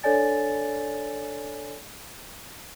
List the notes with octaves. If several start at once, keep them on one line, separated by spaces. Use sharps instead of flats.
D4 A4 C#5 D5 G#5 A6